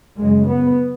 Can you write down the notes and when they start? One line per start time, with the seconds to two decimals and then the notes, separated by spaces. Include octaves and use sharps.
0.18 F#2 C#3 G#3
0.49 B3